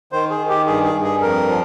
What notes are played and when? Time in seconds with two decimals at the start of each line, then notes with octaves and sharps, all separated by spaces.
0.12 D#3 C5
0.30 G#4
0.40 D#3
0.49 G4
0.66 G2 G#4
0.85 G#4
0.94 G2
1.03 G#4
1.22 F2 A#4
1.48 F3